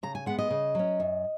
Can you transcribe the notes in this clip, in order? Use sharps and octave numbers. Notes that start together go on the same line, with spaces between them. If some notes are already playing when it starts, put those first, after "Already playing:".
C#3 A#5
G#5
G#3 B3 F#5
D#5
C#3
F#3 C#4
F#2